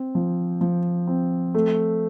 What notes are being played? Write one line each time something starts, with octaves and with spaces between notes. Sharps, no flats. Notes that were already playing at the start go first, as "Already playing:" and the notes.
Already playing: C4
F3
F3
C4
A3